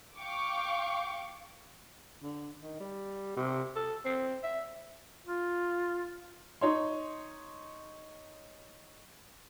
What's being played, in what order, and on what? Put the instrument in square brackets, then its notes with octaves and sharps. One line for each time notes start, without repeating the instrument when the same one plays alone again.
[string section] F5 G5 C#6 D6
[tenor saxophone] D3
D#3
G3
C3
A4
C4
E5
[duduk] F4
[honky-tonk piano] D#4 C#5 C6